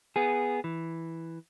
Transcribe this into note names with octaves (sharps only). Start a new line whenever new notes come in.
B3 G#4
E3